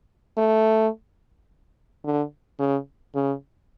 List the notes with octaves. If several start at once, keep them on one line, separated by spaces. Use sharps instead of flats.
A3
D3
C#3
C#3